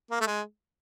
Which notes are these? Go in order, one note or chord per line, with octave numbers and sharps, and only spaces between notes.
A#3
A3
G#3